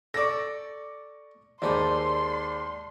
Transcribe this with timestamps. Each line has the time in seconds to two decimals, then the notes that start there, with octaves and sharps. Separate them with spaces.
0.14 A4 D5 C#6 D6 A#6
1.62 D#2 G#2 D#4 G4 D5 A5 B5 C6